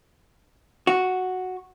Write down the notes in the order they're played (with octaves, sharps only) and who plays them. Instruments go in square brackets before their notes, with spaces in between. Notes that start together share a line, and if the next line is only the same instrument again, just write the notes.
[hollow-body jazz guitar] F#4